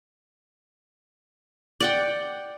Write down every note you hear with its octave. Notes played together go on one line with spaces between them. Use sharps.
D5 F#5 G5